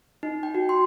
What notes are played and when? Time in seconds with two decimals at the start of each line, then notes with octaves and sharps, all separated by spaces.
0.23 D#4
0.43 G5
0.55 F#4
0.69 C6